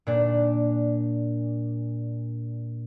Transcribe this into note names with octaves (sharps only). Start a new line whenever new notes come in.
A#2 D4